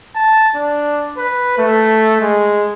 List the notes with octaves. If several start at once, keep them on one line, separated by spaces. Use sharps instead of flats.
A5
D4
B4
A3
G#3